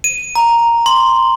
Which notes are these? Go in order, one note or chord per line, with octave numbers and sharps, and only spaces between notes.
D#7
A#5
C6